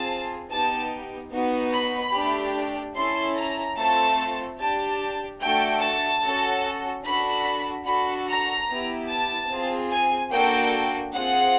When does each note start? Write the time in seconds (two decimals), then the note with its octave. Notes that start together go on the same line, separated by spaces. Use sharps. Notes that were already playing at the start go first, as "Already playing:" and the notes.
Already playing: C4 F4 G#4 A5
0.50 B3 D#4 G4 A5
1.32 B3 D#4 F#4
1.73 B5
2.14 A3 D4 G4
2.95 C#4 E4 A4 C6
3.36 A#5
3.77 A3 C4 F4 A4 A5
4.59 D4 G4 A5
5.41 A3 D4 F#4 A4 G5
5.82 A5
6.22 C#4 F#4 A4
7.04 D4 F#4 A4 B5
7.85 D4 F#4 A4 B5
8.27 A#5
8.68 B3 E4 G4
9.08 A5
9.49 C4 F4 G#4
9.91 G#5
10.31 A#3 D4 F#4 A4 G5
11.12 C4 F4 G#4 F#5